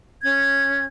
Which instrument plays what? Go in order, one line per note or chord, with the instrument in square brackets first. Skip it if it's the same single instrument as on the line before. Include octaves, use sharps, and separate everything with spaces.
[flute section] C#4 G#6